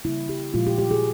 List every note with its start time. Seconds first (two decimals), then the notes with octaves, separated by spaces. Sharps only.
0.05 C#3 G3 A#3 E4
0.29 G4
0.54 A#2 F3 G#3 F4
0.67 G4
0.78 G4
0.91 G#4